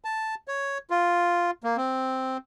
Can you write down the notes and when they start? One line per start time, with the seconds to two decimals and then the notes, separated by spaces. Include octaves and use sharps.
0.05 A5
0.48 C#5
0.90 F4
1.64 A#3
1.77 C4